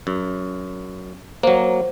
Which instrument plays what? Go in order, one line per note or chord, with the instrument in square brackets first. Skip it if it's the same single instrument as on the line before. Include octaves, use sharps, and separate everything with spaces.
[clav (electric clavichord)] F#2
[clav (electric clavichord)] F#3 A#3 [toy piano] C5